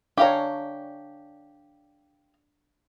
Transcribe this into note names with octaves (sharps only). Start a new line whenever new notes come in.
D4 G4 C#5 F5 A#5